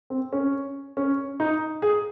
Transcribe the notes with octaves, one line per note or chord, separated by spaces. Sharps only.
C4
C#4
C#4
D#4
G#4